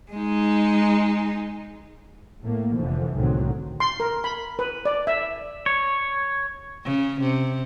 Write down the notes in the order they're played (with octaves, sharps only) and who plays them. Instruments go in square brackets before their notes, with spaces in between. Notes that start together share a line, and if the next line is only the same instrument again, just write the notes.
[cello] G#3 D#4
[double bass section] A2 A3 A#3
F1 D3 E3 F3
C2 A2 D3 D#3 F#3 C4
[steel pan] C6
A#4
B5
B4
D5
E5
[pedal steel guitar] C#5
[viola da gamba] C#3
C3